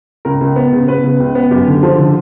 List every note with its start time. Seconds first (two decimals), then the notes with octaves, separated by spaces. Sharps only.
0.25 C#2 A#4
0.41 C#2
0.56 B3
0.73 C#3
0.87 B3 B4
1.04 C#3
1.20 C#2
1.35 B3
1.51 F#2 G4
1.67 D3
1.83 F3
1.98 D3